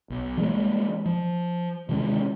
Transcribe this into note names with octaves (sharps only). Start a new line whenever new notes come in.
B1
E3 G3 G#3 A#3
F3
C3 D#3 G#3 C#4